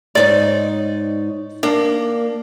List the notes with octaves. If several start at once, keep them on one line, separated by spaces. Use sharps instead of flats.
G#2 D#4 C#5 D5
A#3 D4